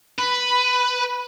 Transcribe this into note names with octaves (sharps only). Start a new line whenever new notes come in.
B4 B5